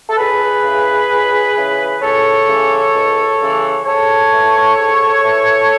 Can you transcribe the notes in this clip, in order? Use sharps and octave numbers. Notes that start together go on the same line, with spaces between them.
A4
C#2 G#4 B4
C#3 E3
C#2
C#3 E3
C#2 A4 C#5
C#3 E3
C#2
C#3 E3
G#2 A4 C#5
E3
G#2
E3